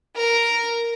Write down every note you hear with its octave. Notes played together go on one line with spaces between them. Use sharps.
A#4